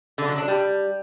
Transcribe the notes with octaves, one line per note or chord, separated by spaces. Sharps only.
D3
F#3
D4
G3